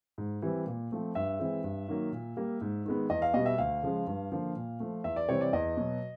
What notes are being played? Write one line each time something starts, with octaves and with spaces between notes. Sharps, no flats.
G#2
E3 G3 C4
A#2
F3 A3 C4
G2 E5
E3 G#3 C4
G2
D#3 F#3 A#3
A#2
G3 A#3
G#2
D#3 G#3 B3
E2 D#5
F5
B2 G3 B3 D#5
E5
D2 F5
C#3 F3 G#3
G2
D3 F3 A#3
A#2
F3 A3
E2 E5
D5
C3 E3 G3 C4 C#5
D5
E2 D#5
B2 F#3